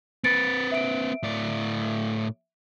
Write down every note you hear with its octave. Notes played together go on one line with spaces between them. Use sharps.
C4 B4 A6 C#7 D7
E5 D7
A2 D5